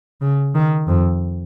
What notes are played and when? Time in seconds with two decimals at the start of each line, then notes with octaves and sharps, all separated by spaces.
0.21 C#3
0.55 D#3
0.88 F2